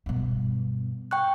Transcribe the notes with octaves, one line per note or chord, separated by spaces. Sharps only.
G2 B2
G5 C#6 F#6